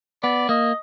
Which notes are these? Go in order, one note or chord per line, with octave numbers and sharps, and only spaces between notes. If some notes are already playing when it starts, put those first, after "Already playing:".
B3 D5
A#3 D#5